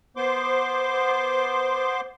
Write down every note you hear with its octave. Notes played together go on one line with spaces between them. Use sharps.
B3 C5 C6 D6